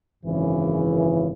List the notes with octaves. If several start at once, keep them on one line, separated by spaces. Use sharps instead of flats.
G#1 F#2 C#3 E3